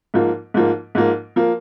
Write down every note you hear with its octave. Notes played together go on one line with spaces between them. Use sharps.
G#2 F3 A#3
G#2 F3 A#3
G#2 F3 A#3
F3 A#3